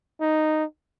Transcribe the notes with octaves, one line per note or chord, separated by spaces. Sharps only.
D#4